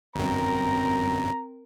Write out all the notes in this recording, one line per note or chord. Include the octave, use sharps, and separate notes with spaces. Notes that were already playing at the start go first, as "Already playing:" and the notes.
G1 F#2 C4 A#4 A#5